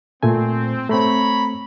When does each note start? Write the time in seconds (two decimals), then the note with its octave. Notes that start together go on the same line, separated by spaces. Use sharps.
0.23 A#2 A3 C4 G#5
0.89 A3 C4 C#5 A#5 B5